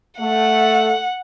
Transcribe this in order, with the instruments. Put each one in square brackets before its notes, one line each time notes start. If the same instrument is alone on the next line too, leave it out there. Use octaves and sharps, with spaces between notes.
[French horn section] A3 [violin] F#5